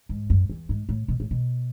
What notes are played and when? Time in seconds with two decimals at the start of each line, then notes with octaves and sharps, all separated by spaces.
0.09 G#2
0.30 F#2
0.50 E2
0.69 G#2
0.89 A2
1.08 B2
1.20 A2
1.31 B2